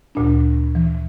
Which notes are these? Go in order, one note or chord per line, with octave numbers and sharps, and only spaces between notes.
D2 A#2 D4
E3